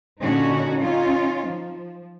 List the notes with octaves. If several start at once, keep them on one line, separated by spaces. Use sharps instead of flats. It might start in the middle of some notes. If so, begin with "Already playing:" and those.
A#2 D3 C#4 D#4 F#4
C#4 D#4 F4
F3